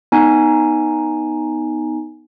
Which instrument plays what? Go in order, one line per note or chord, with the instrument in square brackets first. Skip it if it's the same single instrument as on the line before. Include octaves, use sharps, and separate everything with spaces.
[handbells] B3 D#4 G#5